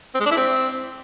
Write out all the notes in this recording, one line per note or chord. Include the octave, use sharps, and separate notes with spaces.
C4
G#3
D4
E4
C4